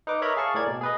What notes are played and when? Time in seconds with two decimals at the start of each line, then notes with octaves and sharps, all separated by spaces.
0.07 D#4 B4 D6
0.22 A#4 C#5 D#5 E5 B5
0.37 G#4 F5 A5 C#6
0.54 A2 A#4 D5 G#6
0.67 B2
0.81 G#4 B4 D#5